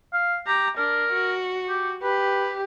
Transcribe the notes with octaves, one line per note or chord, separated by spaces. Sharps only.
F5
G4 A#5
D4 A#4
F#4
G4
G4 B4